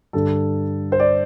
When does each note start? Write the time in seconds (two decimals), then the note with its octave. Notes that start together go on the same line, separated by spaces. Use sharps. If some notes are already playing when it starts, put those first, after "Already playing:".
0.13 G2 D3 A4
0.92 C5
1.00 D5